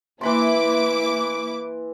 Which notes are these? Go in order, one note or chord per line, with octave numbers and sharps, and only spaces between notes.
E3 A#3 E4 B5 C6 D6